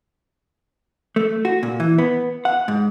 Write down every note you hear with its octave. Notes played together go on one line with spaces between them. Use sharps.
A3
F#4
A#2
E3
B3
F#5
G#2